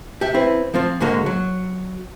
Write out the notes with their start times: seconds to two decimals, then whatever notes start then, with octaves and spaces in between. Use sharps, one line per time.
0.21 G4 E5
0.34 C4 E4 B4
0.74 F3 C4 F4
1.00 G#2 D3 G#3 A#3 F#4
1.26 F#3